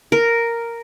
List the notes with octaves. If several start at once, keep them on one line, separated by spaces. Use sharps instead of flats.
A#4